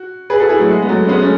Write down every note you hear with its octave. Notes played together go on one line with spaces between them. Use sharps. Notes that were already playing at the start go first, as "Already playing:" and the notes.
Already playing: F#4
G#4 B4
F#4 A4
E4 G#4
F#3 A3
G#3
B3
F#3 A3
C#4
G#3 B3
A3 C#4